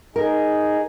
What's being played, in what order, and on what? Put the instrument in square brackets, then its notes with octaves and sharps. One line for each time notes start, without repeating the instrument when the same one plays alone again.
[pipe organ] D#4 G#4 [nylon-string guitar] A#4